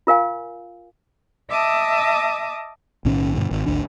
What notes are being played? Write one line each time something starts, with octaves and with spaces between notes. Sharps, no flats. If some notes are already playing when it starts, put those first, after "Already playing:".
F4 A#4 F5 G#5
D#5 E5 A5 D6 D#6
B1 A2 D#3 C#4
G2 B2 D3
G#1
G#1 D2 D4